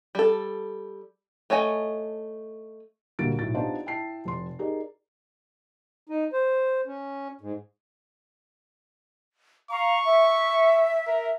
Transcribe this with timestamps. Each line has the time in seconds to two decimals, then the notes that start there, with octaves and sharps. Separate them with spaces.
0.15 G3 A4
1.50 A3 C#5 D#5 G#5
3.19 D2 A#2 G3 A#4 A6 D7
3.39 B1 A2 A6
3.55 B3 D4 D#4 F4 G4 C5
3.86 E4 G5 A5 C7
4.25 F1 C6
4.59 D#4 G4 G#4 A#4 D5
6.09 D#4
6.33 C5
6.87 C#4
7.41 G#2
9.70 F5 A#5 C#6
10.04 E5
11.07 A#4